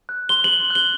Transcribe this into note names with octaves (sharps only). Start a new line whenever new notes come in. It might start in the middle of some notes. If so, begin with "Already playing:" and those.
F#6
C6 G7
F#7
C6
F#6 G7